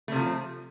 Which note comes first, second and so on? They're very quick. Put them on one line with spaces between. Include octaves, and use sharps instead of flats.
A3 C3 F3